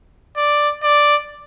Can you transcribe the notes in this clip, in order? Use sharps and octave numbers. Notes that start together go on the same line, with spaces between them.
D5
D5